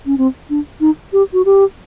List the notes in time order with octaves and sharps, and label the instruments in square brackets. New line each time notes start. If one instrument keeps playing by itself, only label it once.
[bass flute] C#4
C4
D4
D#4
G4
F#4
G4